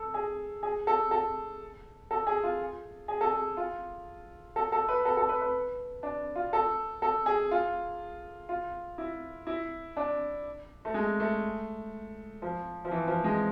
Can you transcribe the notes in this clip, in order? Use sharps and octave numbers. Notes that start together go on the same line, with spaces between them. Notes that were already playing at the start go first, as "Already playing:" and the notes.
Already playing: A4
G#4
G#4
A4
A4
A4
G#4
F4
G#4
A4
G#4
F4
A4
A4
B4
A4
A4
B4
B4
D4
F4
A4
A4
G#4
F4
F4
E4
E4
D4
A3
G#3
A3
F3
F3
E3
F3
G#3